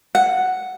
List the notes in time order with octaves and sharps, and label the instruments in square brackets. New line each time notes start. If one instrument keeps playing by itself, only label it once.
[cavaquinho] F#5